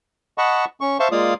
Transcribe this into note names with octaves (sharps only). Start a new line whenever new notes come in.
D#5 F#5 A5 B5 C#6
C#4 C#6
C5 E5 F5 A5 C6 C#6
G#3 A#3 F4 D5 F5 D#6